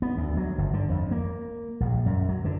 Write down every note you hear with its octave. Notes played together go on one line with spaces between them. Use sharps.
B3
D2
F#3
G1
D3
F2
A#3
A#1
F#2
F#3
D3